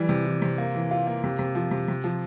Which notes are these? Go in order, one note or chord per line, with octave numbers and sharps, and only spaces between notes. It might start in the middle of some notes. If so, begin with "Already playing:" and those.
Already playing: E3 G3
C3
E3
C3
A#3
E3
F4
A#3
C3
C3
F3
C3
C3
F3